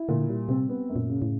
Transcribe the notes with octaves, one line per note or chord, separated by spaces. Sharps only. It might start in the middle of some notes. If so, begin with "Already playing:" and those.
Already playing: E4
A#2 D3
G3
C3 C4
B3
F#2
A#2
C#3
A2